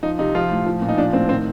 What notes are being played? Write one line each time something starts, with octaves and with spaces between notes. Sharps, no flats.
F3 D#4
C3 D#4
F3 F4
A2
F3
A#2
D#4
F3 D4
A2 C4
D#3 C4